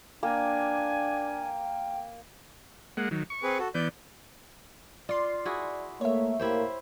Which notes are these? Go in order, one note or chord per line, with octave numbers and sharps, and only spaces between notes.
A#3 D4 G5 G#5
G#3 A#3 F#5
D#3 F#3
C#6
C4 G#4 B4
F#4 A4
E3 B3 D5 G6
F4 D5 C6
E4 F#4 G#4
A3 A#3 C#5 E5
A2 A#3 E4 G4 C5